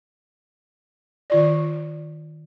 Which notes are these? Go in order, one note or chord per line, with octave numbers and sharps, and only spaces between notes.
D#3 F4 D5